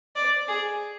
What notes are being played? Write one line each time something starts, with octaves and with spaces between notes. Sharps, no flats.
D5
G#4